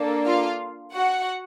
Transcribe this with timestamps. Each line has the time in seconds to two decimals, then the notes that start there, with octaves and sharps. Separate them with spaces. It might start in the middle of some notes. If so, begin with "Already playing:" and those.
Already playing: A#3 D4 A4
0.26 F4 F5
0.94 F#4 F#5